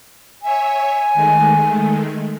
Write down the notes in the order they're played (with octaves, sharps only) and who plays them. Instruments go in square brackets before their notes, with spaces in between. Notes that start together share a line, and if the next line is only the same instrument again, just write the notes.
[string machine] C#5 E5 [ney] G#5
[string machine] D#3 G#3 A3